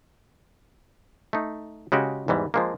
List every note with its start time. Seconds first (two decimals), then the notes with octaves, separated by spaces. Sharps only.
1.33 A3 D#4
1.92 C#3 G#3 F#4 G4
2.28 E2 G#2 E3 G3
2.54 F3 G#3 A#3